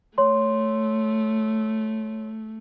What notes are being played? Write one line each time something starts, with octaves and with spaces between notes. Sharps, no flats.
A3 C#5 C6